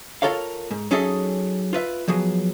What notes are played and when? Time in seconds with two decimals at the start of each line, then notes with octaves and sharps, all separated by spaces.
0.22 F4 A4 A#4 C#5 F5
0.71 G#2
0.91 F#3 C#4 D#4 G#4 A4 E5
1.73 F4 B4 E5
2.08 F3 F#3 B3 G#4